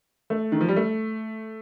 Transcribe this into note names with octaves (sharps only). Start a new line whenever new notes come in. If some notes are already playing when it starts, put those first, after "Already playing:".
A3
D#3
F3
G3
A3